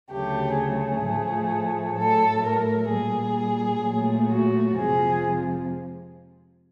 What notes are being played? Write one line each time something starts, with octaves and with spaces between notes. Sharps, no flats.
D2 C#3 F#3 A3 G4
G#4
A2 F3 A3
A2 F#3 A3 A4
A#4
A#2 G3 G#4
A#2 F#3 A3
F#4
F2 C3 F3 G#3 G#4